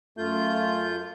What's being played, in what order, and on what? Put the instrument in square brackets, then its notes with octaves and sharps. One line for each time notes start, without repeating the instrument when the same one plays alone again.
[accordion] F#2 F4 G6 [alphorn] A3